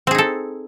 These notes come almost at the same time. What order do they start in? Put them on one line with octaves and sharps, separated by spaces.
C4 G#4 D#4 A4